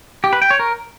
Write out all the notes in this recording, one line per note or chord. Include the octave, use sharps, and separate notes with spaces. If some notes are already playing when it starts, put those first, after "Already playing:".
G4
B4
G5
C#5
A#4